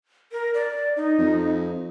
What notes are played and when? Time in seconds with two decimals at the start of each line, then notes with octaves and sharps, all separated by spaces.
0.32 A#4
0.54 D5
0.96 D#4
1.18 F2